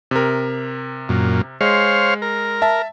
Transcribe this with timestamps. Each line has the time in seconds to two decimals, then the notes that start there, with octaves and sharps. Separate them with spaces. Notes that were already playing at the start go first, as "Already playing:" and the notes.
0.11 C3 A#4
1.09 F#2 A#2
1.61 G#3 C5 C#5 F5
2.22 A#4
2.62 E5 A5